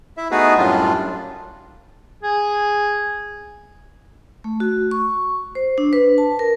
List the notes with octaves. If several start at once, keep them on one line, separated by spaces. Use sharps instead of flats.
E4 E5
A3 B3 D#4 F#4 G#4 B4
F#2 A2 G3 D4 F4
G#4
A3
F#4
C#6
C5
D4
B4
A5
A#4